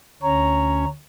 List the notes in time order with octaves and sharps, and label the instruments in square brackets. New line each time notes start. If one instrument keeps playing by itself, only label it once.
[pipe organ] D2 C#4 C#5 [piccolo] A#5